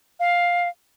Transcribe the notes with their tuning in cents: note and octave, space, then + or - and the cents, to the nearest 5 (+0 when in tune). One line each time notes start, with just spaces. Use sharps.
F5 +10